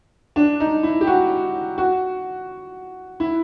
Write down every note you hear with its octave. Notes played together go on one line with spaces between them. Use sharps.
D4
D#4
E4
G4
F#4
F#4
E4